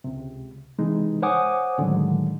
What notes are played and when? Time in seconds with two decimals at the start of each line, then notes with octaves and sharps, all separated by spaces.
0.04 C#2 C3
0.78 C3 E3 G#3 D#4
1.22 C5 C#5 F#5 G#5 D6 D#6
1.78 A2 D3 D#3 F#3 G#3